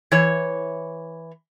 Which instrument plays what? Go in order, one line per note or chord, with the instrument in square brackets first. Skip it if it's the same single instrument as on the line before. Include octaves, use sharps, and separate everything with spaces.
[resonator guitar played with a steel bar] E3 C#5